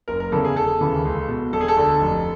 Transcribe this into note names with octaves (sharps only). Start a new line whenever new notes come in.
F#1 A#4
A#4
E2 C#3 E3 A4
G#4
E1 A4
D#2 C#3 E3
C#2
B2
E1 A4
G#4
A4
D2 D3
F1